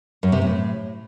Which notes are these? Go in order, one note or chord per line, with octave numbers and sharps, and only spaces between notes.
F#2
C3
A2